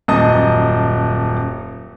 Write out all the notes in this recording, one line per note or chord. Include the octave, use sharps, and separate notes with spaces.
D#1 F#2 D#5 A5 D#6